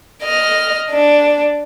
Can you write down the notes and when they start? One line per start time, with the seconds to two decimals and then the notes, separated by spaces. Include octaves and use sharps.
0.23 D#5 F6
0.91 D4